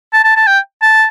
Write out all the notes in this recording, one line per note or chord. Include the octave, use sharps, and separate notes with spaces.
A5
A5
A5
G5
A5